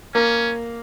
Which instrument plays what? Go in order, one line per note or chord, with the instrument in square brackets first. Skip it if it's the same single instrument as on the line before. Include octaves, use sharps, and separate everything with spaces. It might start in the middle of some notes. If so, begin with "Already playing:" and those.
[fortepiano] A#3 [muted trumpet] C#4